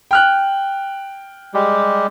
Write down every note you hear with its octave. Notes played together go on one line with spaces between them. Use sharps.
G5 F6 F#6
G3 G#3 G4